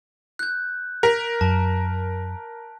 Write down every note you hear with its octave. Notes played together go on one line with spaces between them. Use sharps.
F#6 G6
A#4 B6
F#2 A5